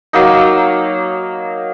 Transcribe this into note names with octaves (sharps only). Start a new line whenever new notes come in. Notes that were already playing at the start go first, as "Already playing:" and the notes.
F#3 A#3 D#4